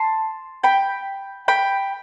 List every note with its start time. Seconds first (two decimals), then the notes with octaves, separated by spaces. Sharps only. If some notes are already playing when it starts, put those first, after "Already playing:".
Already playing: A5 C6
0.64 G5 B5
1.48 G5 B5